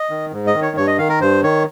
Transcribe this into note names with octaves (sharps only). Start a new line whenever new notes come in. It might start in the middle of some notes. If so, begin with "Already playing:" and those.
Already playing: D#5
D#3
G#2
D#5
D#3
C#5
G2 C#5
D#5
D#3 F5
A#4
G2 C5
D#3 C#5